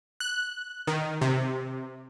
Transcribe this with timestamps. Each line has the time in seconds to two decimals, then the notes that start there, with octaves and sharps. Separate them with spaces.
0.20 F#6
0.87 D#3
1.21 C3